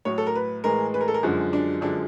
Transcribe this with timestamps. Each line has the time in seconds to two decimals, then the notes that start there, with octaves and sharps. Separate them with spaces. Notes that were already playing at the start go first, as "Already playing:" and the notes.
0.05 A2 F#3 C#5
0.18 A4
0.27 A#4
0.35 B4
0.64 A2 E3 G#3 A#4
0.94 B4
1.01 A#4
1.08 A4
1.14 A#4
1.23 F#2 D3 F3 G#3 F#4
1.53 D4
1.81 F#2 D3 F3 G#3 D4